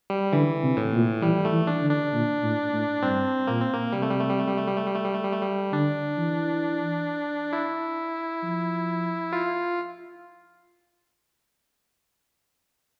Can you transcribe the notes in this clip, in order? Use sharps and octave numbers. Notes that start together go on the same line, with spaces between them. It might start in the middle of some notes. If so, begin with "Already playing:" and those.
G3
D3 E3
C3
A2
A#2
E3 G3
A3
E3
D4
D3
D4
A#2
A2
A2
G2 C4
A#2 A#3
C4
A#3
C3 G3
A3
G3
A3
G3
A3
G3
A3
G3
A3
G3
A3
G3
A3
G3
A3
G3
D3 D4
E3
E4
F3
F4